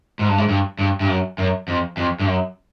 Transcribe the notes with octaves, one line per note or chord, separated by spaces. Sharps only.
G#2
G2
G#2
G2
G2
G2
F#2
F#2
F2
F2
G2
F#2